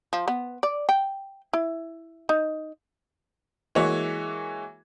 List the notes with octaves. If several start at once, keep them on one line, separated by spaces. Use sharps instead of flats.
F3
B3
D5
G5
E4
D#4
E3 G#3 A#3 F#4 C#5 E5